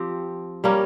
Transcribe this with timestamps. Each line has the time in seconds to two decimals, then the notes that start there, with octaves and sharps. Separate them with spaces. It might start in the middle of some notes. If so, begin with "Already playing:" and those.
Already playing: F3 C4 G4
0.64 G3 A#3 C#4